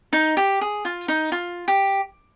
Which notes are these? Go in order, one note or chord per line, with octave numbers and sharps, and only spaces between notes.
D#4
G4
G#4
F4
D#4
F4
G4